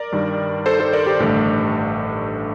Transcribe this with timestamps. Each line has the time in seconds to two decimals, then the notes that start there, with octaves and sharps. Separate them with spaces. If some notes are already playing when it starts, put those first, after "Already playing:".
Already playing: A#4 D5
0.12 G2 D#3 G3
0.66 A4 C5
0.80 A4 C5
0.93 A#4 D5
1.07 G4
1.20 A1 G2 D3 A3